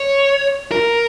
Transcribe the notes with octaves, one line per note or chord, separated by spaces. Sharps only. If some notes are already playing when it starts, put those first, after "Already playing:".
Already playing: C#5
A#4